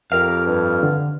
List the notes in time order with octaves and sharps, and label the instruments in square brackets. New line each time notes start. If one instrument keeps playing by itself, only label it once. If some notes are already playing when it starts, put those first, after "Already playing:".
[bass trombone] F2 [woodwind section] G4 A#4 [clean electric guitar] F5
[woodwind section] G2
[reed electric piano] D3